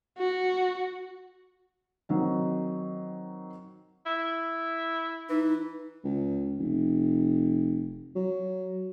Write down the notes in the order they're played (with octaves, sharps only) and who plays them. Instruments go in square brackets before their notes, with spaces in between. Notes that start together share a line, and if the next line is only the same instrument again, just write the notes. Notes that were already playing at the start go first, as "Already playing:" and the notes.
[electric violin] F#4
[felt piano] D#3 F#3 C4 D#4
[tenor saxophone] E4
[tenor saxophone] E3 [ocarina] D#4
[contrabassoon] C#2
F1
F#3